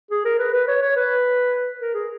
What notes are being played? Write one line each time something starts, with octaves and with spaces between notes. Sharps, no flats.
G#4
A#4
B4
B4
C#5
C#5
B4
A#4
G#4